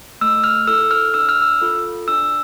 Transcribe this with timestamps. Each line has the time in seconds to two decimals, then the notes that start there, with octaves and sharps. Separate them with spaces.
0.21 A3 E6
0.44 F6
0.67 E4 A4 E6
0.91 F6
1.14 D4 E6
1.29 F6
1.42 E6
1.62 F4 A4
2.08 D4 E6